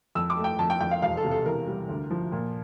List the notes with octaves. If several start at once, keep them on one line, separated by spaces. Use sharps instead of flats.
F2 E6
D6
A3
G5
F2 A5
G5
F2 G5
F5
E1 F5
A4
C3
A4
E2 A#4
G3
D2
F3
A#2